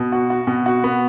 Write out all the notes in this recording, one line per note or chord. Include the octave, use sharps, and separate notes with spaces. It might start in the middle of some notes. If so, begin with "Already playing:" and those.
Already playing: B2
F#4
F#4
B2
F#4
B3